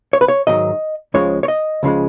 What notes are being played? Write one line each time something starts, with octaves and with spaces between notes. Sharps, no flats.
C#5
B4
C#5
G#2 D#3 F#3 D#5
C#2 C#3 F3 G#3 C#5
C#5
D#5
C#2 C#3 F3 G#3